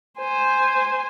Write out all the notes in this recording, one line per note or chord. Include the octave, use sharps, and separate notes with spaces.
C5 G#5